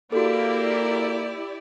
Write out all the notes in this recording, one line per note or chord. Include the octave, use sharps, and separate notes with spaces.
A#3 E4 F#4 G4 A4 D5